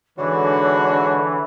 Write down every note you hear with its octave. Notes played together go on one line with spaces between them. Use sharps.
G#2 D3 E3 D4 F#4 C#5